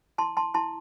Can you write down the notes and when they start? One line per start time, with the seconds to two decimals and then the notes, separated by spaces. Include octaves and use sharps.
0.18 E4 A5 C6
0.37 A5 C6
0.54 E4 A5 C6